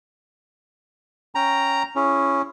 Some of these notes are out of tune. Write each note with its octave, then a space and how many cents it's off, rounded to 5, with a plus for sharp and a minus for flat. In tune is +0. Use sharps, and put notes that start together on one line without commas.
C#4 +0 G5 +0 A#5 +0
C#4 +0 E4 +30 G#4 +0